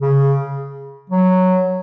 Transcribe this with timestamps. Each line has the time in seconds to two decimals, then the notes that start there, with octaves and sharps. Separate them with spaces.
0.01 C#3
1.10 F#3